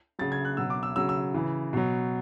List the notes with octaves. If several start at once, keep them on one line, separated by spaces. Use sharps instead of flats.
C#3 F#3 A6
G#6
F#6
B2 F#3 E6
D6
E6
C#3 F#3 E6
E6
C#3 E3
B2 F#3